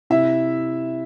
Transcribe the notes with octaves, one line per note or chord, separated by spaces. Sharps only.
C3 E4 E5